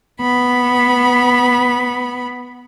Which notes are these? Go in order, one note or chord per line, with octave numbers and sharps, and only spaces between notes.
B3 B5